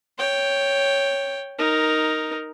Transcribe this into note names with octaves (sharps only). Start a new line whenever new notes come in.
C#5 G5
D#4 A#4